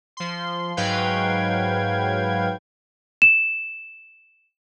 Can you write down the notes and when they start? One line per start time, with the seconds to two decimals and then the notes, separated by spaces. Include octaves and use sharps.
0.17 F3 C6
0.77 G#2 F#3 B4 F5 G5 G#6
3.22 E7